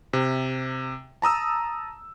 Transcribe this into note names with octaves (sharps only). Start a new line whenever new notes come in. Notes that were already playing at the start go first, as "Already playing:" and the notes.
C3
A5 A#5 D#6 E6